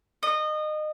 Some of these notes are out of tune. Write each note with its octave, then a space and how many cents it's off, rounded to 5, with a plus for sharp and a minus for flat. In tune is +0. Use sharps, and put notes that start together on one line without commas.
D#5 -25